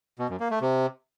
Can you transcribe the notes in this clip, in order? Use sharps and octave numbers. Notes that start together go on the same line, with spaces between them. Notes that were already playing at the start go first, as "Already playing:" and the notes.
B2
F#2
A#3
A3
C3